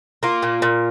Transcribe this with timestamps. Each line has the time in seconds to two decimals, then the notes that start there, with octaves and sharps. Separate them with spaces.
0.23 A#3 F4
0.43 A#2
0.62 A#2